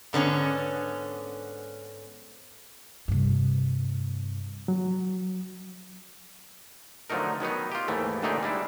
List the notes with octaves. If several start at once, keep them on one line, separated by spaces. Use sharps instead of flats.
G#2 D3 B3 C#4
G2 C3
F#3
D3 F3 F#3 A3 D#4 A#4
D#3 F#3 B3 D#4
F4 G4
D#2 G#2 E3 A3
A#2 D3 A3 D#4 G4 G#4
G3 G#3 D4 E4